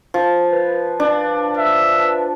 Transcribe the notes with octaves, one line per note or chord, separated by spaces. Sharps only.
F3
B4
D4
E5